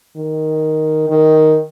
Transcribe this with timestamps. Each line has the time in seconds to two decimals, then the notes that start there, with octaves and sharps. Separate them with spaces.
0.17 D#3
1.10 D#3